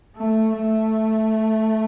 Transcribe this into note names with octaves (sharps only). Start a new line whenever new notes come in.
A3
A3